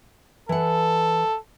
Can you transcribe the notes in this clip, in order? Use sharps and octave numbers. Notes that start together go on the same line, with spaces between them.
E3 A4 F#5